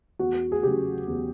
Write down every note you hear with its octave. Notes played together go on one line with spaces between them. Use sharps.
E2 F#4
G#4
C#3 F#3 G4
E2